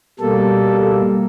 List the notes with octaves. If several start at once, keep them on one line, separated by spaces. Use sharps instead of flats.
B2 G3 A#3 A4